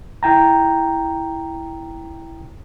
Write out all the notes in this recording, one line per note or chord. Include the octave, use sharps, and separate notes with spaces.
E4 G5 A#5